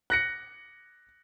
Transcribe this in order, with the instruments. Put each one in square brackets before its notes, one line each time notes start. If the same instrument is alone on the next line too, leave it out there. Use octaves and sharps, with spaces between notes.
[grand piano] F#6 A#6 C#7